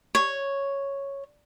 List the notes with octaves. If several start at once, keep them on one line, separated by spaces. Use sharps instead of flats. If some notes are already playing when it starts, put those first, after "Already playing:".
C#5